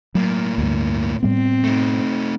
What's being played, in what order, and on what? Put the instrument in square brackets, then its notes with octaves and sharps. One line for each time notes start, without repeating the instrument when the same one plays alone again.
[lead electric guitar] A2 A#3 [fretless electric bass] F#3
[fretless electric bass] D2 G2
[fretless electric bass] A2 G3 B3 [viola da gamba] C4
[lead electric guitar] A3 D#4